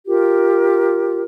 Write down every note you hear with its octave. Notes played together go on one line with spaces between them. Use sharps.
F4 G4 A#4